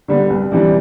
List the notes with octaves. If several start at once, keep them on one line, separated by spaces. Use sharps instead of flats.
D3 G3 B3
C2
C3 E3 G3 D4